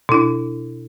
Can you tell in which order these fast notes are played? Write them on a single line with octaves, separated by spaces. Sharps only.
B2 E4 D4